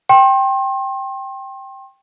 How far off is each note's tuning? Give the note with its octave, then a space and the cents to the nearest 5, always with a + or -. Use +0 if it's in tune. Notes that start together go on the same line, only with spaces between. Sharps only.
G5 +0 C6 +40